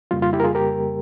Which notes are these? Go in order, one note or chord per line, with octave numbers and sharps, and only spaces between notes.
F2 C#3 G3 A#3 F4
F4
E4 G4
A#4
F4 G#4
G4 A#4